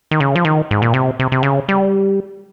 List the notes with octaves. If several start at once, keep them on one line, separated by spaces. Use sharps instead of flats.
D#3
C#3
F3
D#3
G#2
A#2
C3
C3
C3
C#3
G3